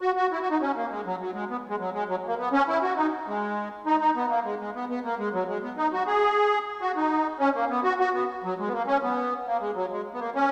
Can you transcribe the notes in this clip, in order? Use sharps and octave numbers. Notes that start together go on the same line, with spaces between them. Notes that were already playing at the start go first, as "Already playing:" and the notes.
F#4
F#4
E4
F#4
D#4
C#4
A#3
G#3
F#3
F#3
G#3
B3
G#3
F#3
G#3
F#3
A#3
B3
C#4
E4
F#4
D#4
G#3
D#4
D#4
B3
A#3
G#3
G#3
B3
B3
A#3
G#3
F#3
G#3
B3
D#4
F#4
G#4
F#4
D#4
C#4
A#3
B3
F#4
F#4
B3
F#3
G#3
B3
A#3
C#4
B3
A#3
G#3
F#3
G#3
B3
A#3
C#4